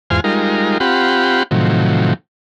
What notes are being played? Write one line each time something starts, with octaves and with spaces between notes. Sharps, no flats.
E2 G#2 F4 C5 G#5 F6
G3 G#3 D#4 F4 A#4
C4 F4 G4 F#5 B5
A2 C3 D#3 F3 F#3